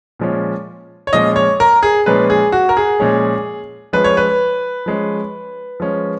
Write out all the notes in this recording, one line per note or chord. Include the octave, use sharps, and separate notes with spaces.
A#2 F3 G#3 C#4
C#5
A#2 F3 G#3 C#4 D#5
C#5
A#4
G#4
A#2 F3 G#3 C#4 B4
G#4
F#4
A#4
G#4
A#2 F3 G#3 C#4
F3 G#3 C#4 B4
C#5
B4
F3 G#3 C#4
F3 G#3 C#4